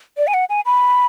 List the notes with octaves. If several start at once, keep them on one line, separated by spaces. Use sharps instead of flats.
D5
G#5
F#5
G#5
B5